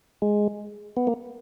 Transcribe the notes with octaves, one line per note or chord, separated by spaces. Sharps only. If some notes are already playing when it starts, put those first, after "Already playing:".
G#3
B3
A#3